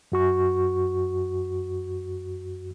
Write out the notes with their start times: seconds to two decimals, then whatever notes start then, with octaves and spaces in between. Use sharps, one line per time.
0.12 F#2 F#4 C#6